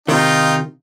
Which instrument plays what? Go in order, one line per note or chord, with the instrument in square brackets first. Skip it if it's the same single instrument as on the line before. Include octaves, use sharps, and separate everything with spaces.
[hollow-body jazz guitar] C3 D#3 [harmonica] D#4 F4 G5